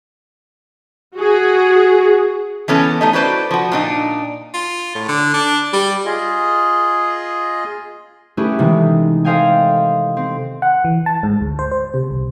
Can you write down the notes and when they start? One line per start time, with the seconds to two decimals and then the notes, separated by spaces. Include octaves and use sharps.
1.15 F#4 G#4
2.68 E3 B3 C#4 A4
3.01 G3 A3 D#4
3.13 E4 F#4 A4 B4 C5 D5
3.51 F3 F#4
3.72 A#2 D4 D#4
4.54 F4
4.95 A2
5.08 D3
5.34 D4
5.73 G3
6.06 F4 G#4 D#5
8.37 A3 C#4 E4 G4 G#4 B4
8.59 C3 D#3 E3 G#3
9.24 A4 C5 D#5 F5 G5 G#5
10.17 C4
10.62 F#5
10.85 E3
11.06 A5
11.23 G#2
11.41 D2
11.59 C5
11.72 C5
11.94 C3
12.11 C2